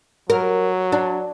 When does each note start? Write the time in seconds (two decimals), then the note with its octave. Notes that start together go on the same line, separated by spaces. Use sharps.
0.30 F#3 A#4
0.92 D4